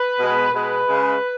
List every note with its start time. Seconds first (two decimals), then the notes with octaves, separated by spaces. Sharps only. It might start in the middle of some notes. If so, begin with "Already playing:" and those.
Already playing: B4
0.19 B2 G#3
0.53 B2 G#3 B4
0.88 C#3 G#3